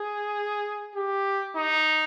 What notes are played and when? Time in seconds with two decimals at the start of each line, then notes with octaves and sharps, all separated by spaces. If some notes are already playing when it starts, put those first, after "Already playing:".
Already playing: G#4
0.96 G4
1.56 D#4